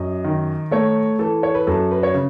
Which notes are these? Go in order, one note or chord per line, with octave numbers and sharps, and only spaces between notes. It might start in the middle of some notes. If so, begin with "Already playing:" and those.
Already playing: F#2 D#5
D#3
A3 C#5
E3 A4
C#5
B4
F#2 A4
B4
C#5
C#3